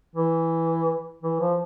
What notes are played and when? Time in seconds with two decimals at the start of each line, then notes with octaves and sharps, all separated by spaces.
0.15 E3
1.23 E3
1.41 F3